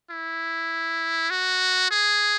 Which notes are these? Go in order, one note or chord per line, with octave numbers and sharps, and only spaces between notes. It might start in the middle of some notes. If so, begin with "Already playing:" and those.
E4
F#4
G#4